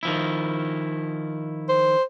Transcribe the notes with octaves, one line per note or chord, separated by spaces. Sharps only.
D#3 F3 E4
C5